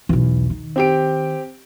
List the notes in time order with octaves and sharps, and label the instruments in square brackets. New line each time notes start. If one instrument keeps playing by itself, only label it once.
[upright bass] B1 E2
D#3
[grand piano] C4 G4 D7